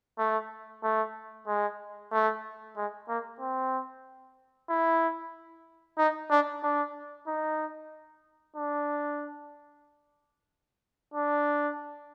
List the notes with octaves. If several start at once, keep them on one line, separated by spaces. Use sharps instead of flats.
A3
A3
G#3
A3
G#3
A#3
C4
E4
D#4
D4
D4
D#4
D4
D4